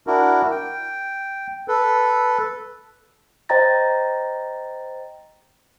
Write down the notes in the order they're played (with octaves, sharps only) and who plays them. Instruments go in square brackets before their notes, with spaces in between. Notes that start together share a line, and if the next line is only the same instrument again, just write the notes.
[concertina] D4 E4 F#4 A#4
G5
A4 B4
[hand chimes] C5 D#5 G5 A#5 A6 A#6